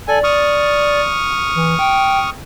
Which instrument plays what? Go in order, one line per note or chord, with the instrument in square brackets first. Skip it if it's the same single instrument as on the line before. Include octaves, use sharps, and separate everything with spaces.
[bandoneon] A4 G#5 [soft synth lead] D5
[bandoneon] C#6 D#6 F6
[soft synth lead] E3
G5